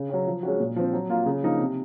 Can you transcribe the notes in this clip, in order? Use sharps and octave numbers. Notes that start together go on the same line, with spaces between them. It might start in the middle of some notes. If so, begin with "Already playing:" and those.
Already playing: C#3
F#3 C#4
F3
G#3 C#4 F#4
A#2
F3 C4
F#3
A#3 F4
C#3
F3 A#3 D#4
C3